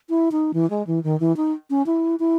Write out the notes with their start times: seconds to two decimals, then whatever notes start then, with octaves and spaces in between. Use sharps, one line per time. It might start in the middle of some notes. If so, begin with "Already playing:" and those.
0.09 E4
0.32 D#4
0.54 E3
0.70 G#3
0.87 E3
1.03 D#3
1.20 E3
1.37 D#4
1.70 C#4
1.86 E4
2.19 E4